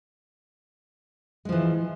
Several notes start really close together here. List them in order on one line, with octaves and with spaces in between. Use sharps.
G#3 F3 E3